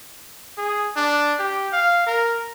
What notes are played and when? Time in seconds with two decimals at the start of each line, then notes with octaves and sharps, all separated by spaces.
0.58 G#4
0.96 D4
1.39 G4
1.73 F5
2.06 A#4